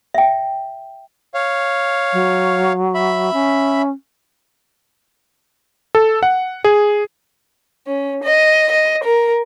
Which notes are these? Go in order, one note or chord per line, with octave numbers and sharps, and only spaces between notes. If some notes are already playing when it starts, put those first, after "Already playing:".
E5 G5
C#5 F5
F#3
E5 B5
C#4
A4
F#5
G#4
C#4
D#5
D#5
A#4